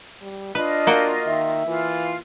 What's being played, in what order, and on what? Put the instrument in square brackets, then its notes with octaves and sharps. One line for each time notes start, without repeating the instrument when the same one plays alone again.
[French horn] G3
[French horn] D4 [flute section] F4 D#5 [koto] B4
[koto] A#3 F#4 G5
[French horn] D#3 [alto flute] E5
[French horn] E3 [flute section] F4